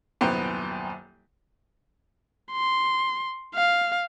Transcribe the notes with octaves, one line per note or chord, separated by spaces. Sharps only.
D#1 C2 F#2 B3 C5 G5
C6
F5